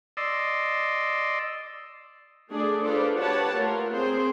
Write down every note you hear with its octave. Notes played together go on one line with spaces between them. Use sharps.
D5 D#5 C6 E6
A3 D4 G#4 D5
D4 F4 A4 B4 C5 D5
G4 B4 C#5 F#5 A5
A3 F4 A#4
C4 G#4 C5